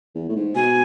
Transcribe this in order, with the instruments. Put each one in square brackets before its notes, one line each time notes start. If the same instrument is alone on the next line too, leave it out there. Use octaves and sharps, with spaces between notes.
[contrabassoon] E2
A2
G#2
[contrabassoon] B2 [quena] G#5